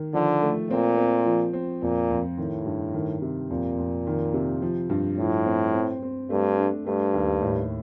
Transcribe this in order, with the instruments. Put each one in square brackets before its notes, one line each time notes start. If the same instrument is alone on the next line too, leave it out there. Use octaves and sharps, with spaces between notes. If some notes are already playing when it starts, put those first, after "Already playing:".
Already playing: [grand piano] D#3
[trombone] D3 [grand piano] F3
[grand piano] A3
[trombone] A#2 [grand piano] C4
[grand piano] C4
F3
C4
[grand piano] F2 [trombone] A#2
[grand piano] F2
[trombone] A2 [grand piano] D#3
[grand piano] G2
D#3
C3
[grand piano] F2 [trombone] A#2
[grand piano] F2
D#3
C3
F3
G2
[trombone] A2 [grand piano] F3
[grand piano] C4
C4
C4
[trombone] G2 [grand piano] A3
[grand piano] D4
[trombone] G2 [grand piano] A3
[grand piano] D#2
A2